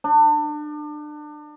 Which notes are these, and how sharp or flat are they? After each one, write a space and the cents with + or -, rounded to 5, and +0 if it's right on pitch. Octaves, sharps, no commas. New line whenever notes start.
D4 +30